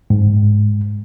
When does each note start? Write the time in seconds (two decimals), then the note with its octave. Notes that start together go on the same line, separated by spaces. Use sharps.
0.10 G#2